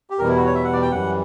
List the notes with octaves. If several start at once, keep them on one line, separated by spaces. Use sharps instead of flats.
G4
E2 B2 G3 A#4
E4
F#4
C#5
E5
F#5
D5
G5
F#2 E3 G3 F#5